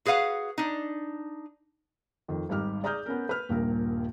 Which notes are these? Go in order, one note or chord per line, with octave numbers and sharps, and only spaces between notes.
F#4 G#4 B4 F5 F#5
D4 D#4
F2 D#3
G#1 G#2 G3 D#4 G4 F6
G#4 D5 A#5 D#6 F6 G6
B3 C#4 A#4
B4 F6
D#1 A#1 G2 A#2 A#4